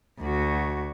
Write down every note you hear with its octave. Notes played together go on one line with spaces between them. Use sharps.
D2 F#4